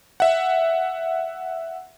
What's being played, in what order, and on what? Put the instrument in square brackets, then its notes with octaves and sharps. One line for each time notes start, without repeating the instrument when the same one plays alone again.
[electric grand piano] E5 F#5